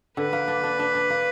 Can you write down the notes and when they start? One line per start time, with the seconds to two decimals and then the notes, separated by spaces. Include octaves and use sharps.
0.17 D3 B4
0.33 A#3
0.48 D4
0.64 D4
0.80 D4
0.95 D4
1.10 A#3